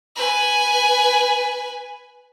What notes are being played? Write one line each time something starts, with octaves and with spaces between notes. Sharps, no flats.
B4 G#5